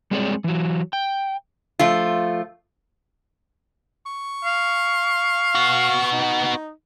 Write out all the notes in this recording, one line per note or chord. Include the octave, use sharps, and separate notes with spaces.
G3 G#3 C4 G#4 C#5 D5
E3 F#3
G5
F3 A3 F4
C#6
F5
B3 F#4
D#4